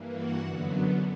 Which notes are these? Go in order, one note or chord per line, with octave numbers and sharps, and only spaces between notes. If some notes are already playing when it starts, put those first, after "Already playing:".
Already playing: G2 E3 A#3
F#4 F#5
F#2 D3 F#3 B3